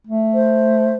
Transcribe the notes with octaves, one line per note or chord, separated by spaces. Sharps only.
A3
C5